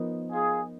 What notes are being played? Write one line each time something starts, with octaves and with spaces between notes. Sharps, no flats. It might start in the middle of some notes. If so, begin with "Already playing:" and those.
Already playing: F3 B3 D#4 A#4
F4 G#4